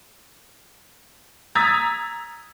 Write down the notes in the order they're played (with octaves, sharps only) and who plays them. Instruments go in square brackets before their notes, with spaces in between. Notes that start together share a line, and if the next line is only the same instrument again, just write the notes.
[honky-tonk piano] A#5 D#6 E6 G#6 A6 B6